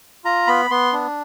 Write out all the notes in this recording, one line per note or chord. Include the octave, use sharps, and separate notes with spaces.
F4 A#5
B3 B5
B3 C6
D4